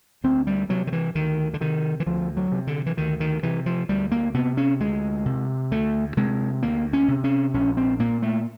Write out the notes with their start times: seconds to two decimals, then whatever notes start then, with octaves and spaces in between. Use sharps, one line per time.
0.24 D2 C4
0.47 G3
0.69 C3 F#3
0.87 D#3
0.92 E3
1.15 D2 D#3
1.54 D3
1.61 C3 D#3
2.00 E3
2.06 D2 F3
2.37 F#3
2.52 C3
2.67 D3
2.86 E3
2.97 D2 D#3
3.20 D#3
3.43 C3 E3
3.66 F3
3.89 D2 G3
4.12 A#3
4.34 C3 B3
4.57 C#4
4.80 D2 G#3
5.26 C3
5.71 D2 A3
6.17 C3 G#3
6.63 D2 A#3
6.93 C#4
7.08 C3
7.24 C#4
7.54 A#1 C#4
7.77 C4
7.99 A#2 A#3
8.22 A3